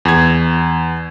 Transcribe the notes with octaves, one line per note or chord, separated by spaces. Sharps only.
E2 G#6